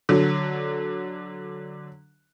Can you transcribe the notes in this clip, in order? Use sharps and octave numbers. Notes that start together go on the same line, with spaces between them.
D3 F#3